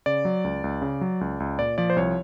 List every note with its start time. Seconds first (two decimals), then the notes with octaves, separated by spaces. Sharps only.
0.06 C#3 D5
0.25 F#3
0.44 C#2
0.64 C#2
0.82 C#3
1.01 F#3
1.21 C#2
1.40 C#2
1.59 A#2 D5
1.78 F3 D5
1.90 C5
1.96 C2 C#5